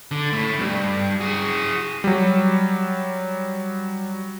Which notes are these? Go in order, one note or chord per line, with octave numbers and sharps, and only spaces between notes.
D3
A2 A3
B1 G2
F#4 G#4
F#3 G3